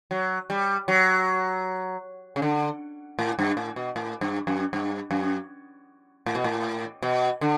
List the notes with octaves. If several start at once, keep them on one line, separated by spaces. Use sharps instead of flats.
F#3
G3
F#3
C#3
D3
A2
G2
A2
B2
A2
G2
F#2
G2
F#2
A2
B2
A2
B2
D3